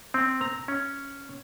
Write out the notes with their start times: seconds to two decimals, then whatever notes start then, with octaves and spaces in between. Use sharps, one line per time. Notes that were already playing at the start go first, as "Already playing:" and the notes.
0.14 C4
0.41 A#5
0.68 C#4